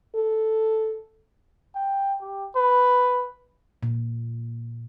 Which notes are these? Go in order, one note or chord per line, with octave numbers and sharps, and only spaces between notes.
A4
G5
G4
B4
A#2